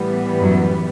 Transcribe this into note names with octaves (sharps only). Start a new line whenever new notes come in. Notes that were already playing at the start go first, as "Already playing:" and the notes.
Already playing: A2 E3 G3 B3
F#2